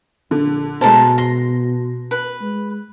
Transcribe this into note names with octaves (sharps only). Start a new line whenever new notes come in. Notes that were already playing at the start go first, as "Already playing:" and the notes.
A#1 D3
B2 G#3 A4 A#4 C5 A5
C6 A#6
B4
G#3